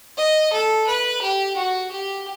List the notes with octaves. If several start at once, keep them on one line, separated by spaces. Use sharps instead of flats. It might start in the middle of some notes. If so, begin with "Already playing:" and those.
D#5
A4
B4
G4
F#4
G4